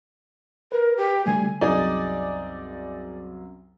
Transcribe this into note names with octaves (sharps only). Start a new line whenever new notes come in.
A#4 B4
G4
D3 G3 A3 G#5
C2 F#2 D#4 G#4 D5